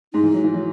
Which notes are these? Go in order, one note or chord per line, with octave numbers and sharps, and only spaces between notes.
G#2 G#3 D#4
E3
F#3
E3
F#3